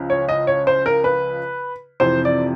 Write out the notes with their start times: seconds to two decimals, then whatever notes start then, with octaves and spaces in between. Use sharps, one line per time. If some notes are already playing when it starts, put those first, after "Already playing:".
Already playing: C#2 C#3 F3
0.10 C#5
0.29 D#5
0.47 C#5
0.67 C5
0.86 A#4
1.04 B4
2.00 F2 C3 E3 C5
2.25 D5